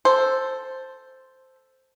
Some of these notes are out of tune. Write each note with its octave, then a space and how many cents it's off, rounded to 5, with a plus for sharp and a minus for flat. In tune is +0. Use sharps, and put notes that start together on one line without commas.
A4 +0 C5 +0